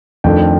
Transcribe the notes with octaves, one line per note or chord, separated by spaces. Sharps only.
F2 D#3 A3 D4 G5